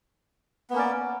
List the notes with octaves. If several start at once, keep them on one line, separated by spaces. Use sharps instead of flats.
A#3 B3 C#4 D5